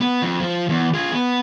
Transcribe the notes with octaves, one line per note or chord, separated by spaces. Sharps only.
B3
F2
F3
E2
F4 G#4
B3